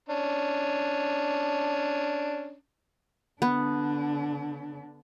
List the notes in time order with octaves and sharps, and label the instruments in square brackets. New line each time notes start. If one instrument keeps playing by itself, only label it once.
[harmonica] C#4 D4
[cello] D3 D4 [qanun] B3